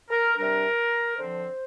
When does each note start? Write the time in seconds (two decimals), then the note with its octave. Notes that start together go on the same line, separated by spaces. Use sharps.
0.10 A#4
0.37 C3 G3 D4 A#4
1.18 D3 F3 C4 C5